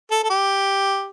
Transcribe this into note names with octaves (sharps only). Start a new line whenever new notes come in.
A4
A4
G4